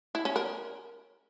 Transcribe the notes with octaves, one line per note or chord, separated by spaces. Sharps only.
E4
C#4
A#4